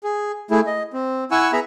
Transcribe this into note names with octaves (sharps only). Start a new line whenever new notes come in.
G#4
A3 E4 G#4
D#5
C4
E4 F#5 G#5 C#6 E6
B3 G#4 E5 A#5 B5